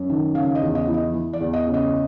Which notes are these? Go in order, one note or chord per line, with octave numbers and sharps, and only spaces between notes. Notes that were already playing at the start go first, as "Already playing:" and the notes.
Already playing: F#2
D#3
C#3 F5
D#5
E2
D#5
E3
D#5
E3
D5
E2
D#5
C#3
D#5